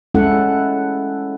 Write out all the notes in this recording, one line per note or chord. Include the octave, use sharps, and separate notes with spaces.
G#3 C#4 E4 A4 F#5